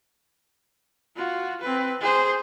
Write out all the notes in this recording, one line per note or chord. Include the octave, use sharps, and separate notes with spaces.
F4 F#4
C4 B4
G#4 C5